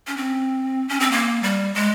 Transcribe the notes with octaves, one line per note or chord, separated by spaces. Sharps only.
C#4
C4
C#4
C4
A#3
G3
G#3